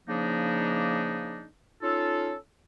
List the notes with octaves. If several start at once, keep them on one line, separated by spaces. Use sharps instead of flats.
C#3 F3 A#3 D4 D#4
C#4 D#4 F4 A4